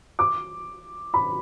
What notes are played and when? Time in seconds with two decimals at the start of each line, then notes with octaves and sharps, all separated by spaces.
0.19 D6
1.14 B5